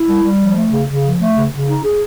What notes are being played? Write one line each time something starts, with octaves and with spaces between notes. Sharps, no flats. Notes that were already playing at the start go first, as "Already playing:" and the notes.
Already playing: E4
G3
G3
F3
A3
C#3
C#3
F3
A3
C#3
C#3
D#4
G#4